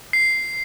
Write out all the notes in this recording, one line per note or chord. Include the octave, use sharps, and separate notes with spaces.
C7